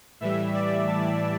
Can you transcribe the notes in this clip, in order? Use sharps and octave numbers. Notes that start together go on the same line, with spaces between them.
A2 E3 G3 E5
D5
A5